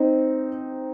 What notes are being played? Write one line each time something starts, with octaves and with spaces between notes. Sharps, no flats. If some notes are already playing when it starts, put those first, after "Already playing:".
Already playing: C4 D#4